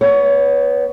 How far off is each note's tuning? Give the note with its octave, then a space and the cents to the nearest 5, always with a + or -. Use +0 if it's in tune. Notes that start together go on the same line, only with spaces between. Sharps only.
B3 +0 C#5 +25